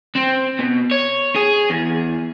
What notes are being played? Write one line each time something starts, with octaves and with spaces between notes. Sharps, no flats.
C4
B2
C#5
G#4
E2